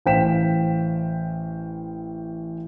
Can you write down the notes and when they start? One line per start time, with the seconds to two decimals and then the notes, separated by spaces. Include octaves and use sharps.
0.06 A1 C5 F5 G5 B6 E7